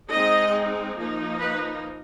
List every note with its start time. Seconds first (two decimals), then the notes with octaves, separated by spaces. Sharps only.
0.11 G#3 C4 D#4 D#5
0.98 F3 A#3 D#4
1.41 B4